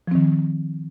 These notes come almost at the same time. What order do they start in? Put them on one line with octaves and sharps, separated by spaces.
F3 C4 D#3